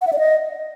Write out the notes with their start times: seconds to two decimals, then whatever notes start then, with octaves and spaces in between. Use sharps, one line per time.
0.01 F#5
0.07 E5
0.13 D5
0.18 D#5